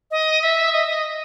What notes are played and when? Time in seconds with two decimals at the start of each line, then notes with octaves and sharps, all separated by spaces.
0.11 D#5
0.42 E5
0.72 D#5
0.87 D#5